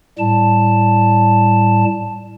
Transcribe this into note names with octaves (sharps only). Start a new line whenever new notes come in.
A2 G3 A5